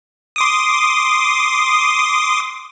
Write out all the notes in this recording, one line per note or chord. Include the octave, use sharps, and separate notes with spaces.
C6 D6 D#6